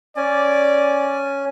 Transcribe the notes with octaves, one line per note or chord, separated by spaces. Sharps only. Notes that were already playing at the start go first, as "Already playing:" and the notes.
C#4 D5 G#5